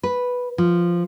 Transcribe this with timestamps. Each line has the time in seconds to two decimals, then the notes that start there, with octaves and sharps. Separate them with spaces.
0.03 B4
0.58 F3